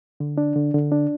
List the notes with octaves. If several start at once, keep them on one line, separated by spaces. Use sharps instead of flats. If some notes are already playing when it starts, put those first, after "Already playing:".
D3
D4
D3
D3
D4